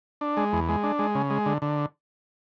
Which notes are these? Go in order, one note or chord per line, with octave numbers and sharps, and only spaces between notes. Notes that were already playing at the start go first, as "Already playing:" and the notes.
D4
G#3
E2
G#3
D4
G#3
C#3
G#3
D3
D3